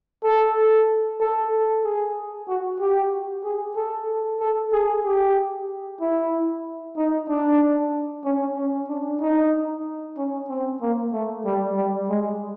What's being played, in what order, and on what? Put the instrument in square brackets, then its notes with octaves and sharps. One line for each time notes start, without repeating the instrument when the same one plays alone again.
[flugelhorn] A4
A4
G#4
F#4
G4
G#4
A4
A4
G#4
G4
E4
D#4
D4
C#4
C#4
D4
D#4
C#4
C4
A#3
A3
G3
G3
G#3